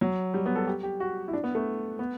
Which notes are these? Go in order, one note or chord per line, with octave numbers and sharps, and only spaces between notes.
F#3
G3
B3
A4
G4
G4
F#4
E4
D4
B3
A3
B3